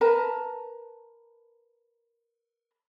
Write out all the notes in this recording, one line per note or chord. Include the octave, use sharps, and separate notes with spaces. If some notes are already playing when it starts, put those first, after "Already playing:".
A#4 B4 A5 A#5